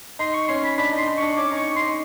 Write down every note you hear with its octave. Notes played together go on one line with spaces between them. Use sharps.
D#4 C6
C#6
C#4 C6
B5
D4 B5
D#4
C6
D#4
D4 C#6
C#4 D6
D#4 C#6
C6
D#4